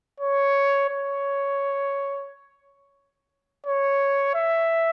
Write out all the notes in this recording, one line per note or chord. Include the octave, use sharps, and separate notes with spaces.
C#5
C#5
C#5
E5